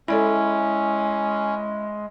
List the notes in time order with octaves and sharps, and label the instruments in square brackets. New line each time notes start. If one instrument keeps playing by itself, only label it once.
[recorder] G#3 [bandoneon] C#4 [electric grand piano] E4 [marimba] A4 D5 B5